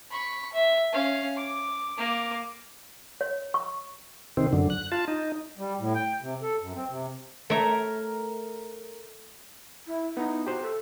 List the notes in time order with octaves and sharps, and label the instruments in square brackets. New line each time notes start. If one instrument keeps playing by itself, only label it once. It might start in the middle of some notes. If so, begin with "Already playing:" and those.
[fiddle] B5 C#6
E5
C#4 F5
D6
A#3 D6
[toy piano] C#5
C#6
[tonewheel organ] C3 D#3 C4
F#2 D3
F#6
F4 A5
D#4
[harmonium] G3
A2
G5
C3
A4
F#2
C4
C3
[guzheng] A3 C#5 E5 [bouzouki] A#4 A#5
[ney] E4
[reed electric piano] B3 E4 [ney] D#4
[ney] F#4 [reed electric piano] G4 C5
[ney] A4